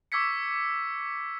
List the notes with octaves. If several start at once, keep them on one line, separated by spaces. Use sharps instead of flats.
C#6 D6 E6 G#6 B6 C#7